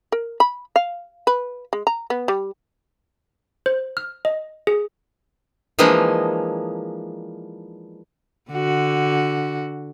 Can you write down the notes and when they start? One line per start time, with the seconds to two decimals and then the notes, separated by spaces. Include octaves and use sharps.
0.12 A#4
0.40 B5
0.76 F5
1.27 B4
1.73 G#3
1.87 A#5
2.10 B3
2.28 G3
3.66 C5
3.97 F6
4.25 D#5
4.67 G#4
5.79 E3 F3 G#3 A#3 D4 D#4
8.51 D3 F#4